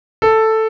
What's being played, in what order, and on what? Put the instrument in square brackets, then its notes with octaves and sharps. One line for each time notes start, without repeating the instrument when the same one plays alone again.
[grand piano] A4